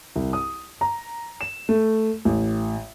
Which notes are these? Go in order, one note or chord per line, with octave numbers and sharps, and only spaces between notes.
C2
D#6
A#5
E7
A3
A1